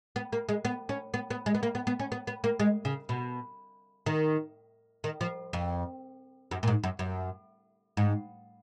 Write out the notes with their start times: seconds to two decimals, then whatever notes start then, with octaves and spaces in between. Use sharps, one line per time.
0.16 B3
0.33 A#3
0.49 G#3
0.65 B3
0.89 C#4
1.14 B3
1.31 B3
1.46 G#3
1.55 B3
1.63 A#3
1.75 B3
1.87 B3
1.99 C#4
2.12 B3
2.27 B3
2.44 A#3
2.60 G#3
2.85 C#3
3.09 B2
4.06 D#3
5.04 D#3
5.21 F3
5.53 F2
6.51 F#2
6.63 A#2
6.68 G#2
6.83 F#2
6.99 F#2
7.97 G#2